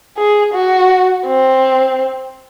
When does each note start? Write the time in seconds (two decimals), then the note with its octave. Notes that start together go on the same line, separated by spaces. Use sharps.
0.17 G#4
0.54 F#4
1.27 C4